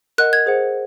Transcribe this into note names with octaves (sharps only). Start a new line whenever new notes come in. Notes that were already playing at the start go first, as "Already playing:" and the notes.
A#4 D#5 F#5 F#6
G#6
G#4 C5 F#5